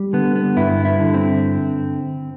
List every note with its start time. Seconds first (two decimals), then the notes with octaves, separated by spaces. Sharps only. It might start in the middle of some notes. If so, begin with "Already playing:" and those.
Already playing: G3
0.13 D3 B3
0.36 B3
0.57 G2 E4
0.85 E4
1.00 D3
1.14 C4